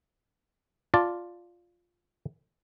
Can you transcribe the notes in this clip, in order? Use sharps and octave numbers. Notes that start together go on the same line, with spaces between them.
F4 D5 A5